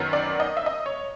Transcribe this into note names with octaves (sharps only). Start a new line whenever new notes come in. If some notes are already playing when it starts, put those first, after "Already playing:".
Already playing: F#2 D#3 F#3 B3
D5
D#5
E5
D#5
C#5